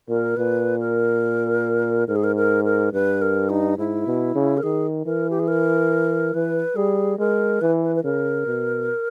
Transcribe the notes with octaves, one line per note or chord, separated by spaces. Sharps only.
A#2 A#4
A#2 B4
A#4
G#2 A#4
G#4
A#4
A#4
A#4
G2 B4
A#4
D#4
G#2 E4
B2
C#3
A#4
D#3 G#4
E3 A#4
G4
G#4
A#4
E3 B4
G3 G#4
G#3 A#4
E3 B4
B4
B4
C#3 A#4
B2